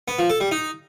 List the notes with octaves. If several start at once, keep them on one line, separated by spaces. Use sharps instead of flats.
B3
F3
A4
G3
D#4